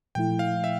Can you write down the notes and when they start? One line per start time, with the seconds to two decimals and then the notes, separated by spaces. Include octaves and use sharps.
0.15 A#2 F3 A3 E4 G5
0.39 F5
0.64 E5